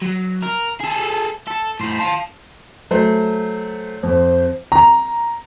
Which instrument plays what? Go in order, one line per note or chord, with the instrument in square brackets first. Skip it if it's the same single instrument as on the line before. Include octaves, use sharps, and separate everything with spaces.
[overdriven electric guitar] F#3
A#4
G#4 A4
A4
A2 C5
F5 A5
[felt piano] F#3 A3 C5
[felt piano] F2 [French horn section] C5
[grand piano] A#5